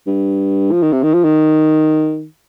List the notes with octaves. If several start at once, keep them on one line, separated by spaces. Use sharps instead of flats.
G2
F3
D#3
C3
D#3
F3
D#3